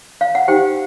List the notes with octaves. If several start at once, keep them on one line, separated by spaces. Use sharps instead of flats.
F5
F#5
D#4 G4 C5 G5